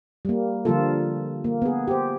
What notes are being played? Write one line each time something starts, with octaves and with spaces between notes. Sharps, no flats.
G3 A#3
D3 F3 G3 A#3 F4 A4
A#3
B3 G#4
G4 C5